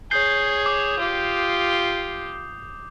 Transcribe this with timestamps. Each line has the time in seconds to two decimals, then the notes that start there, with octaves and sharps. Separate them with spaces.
0.11 G#4 C#5 G6 C7 G7
0.66 D6 D#6
0.99 F4 G4